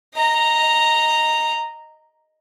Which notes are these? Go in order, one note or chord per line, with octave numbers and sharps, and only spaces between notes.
D#5 A#5